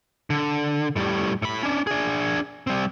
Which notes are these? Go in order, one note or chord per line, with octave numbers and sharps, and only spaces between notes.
D3
A2 G3
A2 B5
C#4 D4
D4 G#4
G3 C4